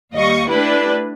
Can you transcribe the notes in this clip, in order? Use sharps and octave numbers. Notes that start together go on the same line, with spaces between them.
D#2 G3 D#5 F5 C#6
A3 D4 E4 G4 B4